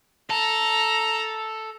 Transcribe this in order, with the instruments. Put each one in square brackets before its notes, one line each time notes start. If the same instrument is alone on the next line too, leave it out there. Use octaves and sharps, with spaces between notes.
[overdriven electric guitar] A4 [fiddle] A#5